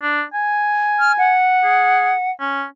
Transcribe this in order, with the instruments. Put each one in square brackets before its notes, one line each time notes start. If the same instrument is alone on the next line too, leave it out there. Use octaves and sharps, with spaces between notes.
[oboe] D4
G#5
[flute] F6
F#5
[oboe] G#4
C#4